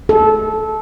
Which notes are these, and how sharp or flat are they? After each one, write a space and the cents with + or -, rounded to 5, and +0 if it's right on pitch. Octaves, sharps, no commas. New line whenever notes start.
A4 -20